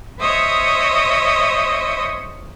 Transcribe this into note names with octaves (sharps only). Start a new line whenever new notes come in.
C5 C#5 D#5 E5 D#6